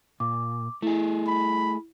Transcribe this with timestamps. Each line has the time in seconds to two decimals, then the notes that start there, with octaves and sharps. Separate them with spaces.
0.20 A#2 D6
0.82 A3 E4 G#4
1.28 B5